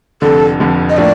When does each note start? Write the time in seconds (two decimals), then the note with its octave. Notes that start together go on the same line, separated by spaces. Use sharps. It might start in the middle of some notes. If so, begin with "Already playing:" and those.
0.22 F1 F2 D3 A4
0.60 F1 F2 D3
0.90 D#5
0.97 A2 F3 A#3 D4 D5